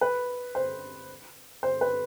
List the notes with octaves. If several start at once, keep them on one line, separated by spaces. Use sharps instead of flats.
B4
C5
C5
B4